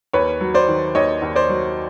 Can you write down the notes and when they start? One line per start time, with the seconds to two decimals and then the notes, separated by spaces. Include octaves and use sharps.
0.13 D#2 B4 C#5
0.41 F#3
0.54 C5 D5
0.68 D#3
0.95 D#2 C#5 D#5
1.22 D#2
1.36 C5 D5
1.49 F#3